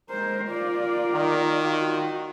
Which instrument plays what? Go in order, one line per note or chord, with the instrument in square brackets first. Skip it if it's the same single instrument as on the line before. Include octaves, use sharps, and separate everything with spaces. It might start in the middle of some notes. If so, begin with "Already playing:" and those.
[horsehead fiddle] G#3 C5 [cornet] A#4
[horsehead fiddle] F4 D5
[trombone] D#3
[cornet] F4 [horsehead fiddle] F#4